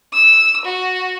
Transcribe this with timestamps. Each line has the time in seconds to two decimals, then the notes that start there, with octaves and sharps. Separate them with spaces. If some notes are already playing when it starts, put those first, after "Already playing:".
0.13 E6
0.65 F#4